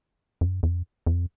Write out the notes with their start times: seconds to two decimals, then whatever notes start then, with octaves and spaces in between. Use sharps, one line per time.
0.41 F#2
0.63 F2
1.06 F2